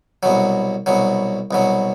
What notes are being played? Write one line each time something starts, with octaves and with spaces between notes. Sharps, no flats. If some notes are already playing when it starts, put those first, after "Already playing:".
C2 B2 F#3
C2 B2 F#3
C2 B2 F#3